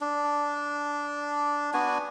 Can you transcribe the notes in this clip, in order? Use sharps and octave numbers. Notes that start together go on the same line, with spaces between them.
D4
B3 D4 F#4 G#5